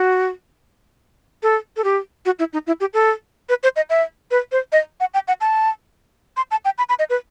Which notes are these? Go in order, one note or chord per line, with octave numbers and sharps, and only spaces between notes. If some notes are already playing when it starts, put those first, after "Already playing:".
Already playing: F#4
A4
A4
G4
F#4
E4
D#4
E4
G4
A4
B4
C5
D#5
E5
B4
C5
D#5
F#5
G5
F#5
A5
C6
A5
G5
B5
B5
D#5
B4